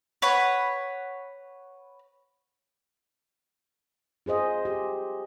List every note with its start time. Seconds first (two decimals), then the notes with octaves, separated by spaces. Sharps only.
0.22 B4 C#5 F#5 B5
4.26 F4 G#4 C5 D#5
4.65 G4